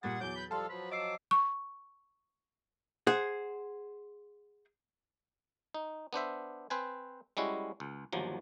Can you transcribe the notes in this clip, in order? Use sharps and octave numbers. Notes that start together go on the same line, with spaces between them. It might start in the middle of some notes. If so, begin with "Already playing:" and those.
A#2 G3 G#4 F#5 A6
E2 F#3 D6 G6
B4
F3 G3 A4 F5 A5 C6
F3 F#3 B4
D#5 D6 E6 C7
C#6
G#4 C5 F#5
D#4
B3 D4 C5 E5
C4 B4 C5 G#5
G3 G#3 C#4 E4 F#4
C#2
G1 D#2 F3 F#3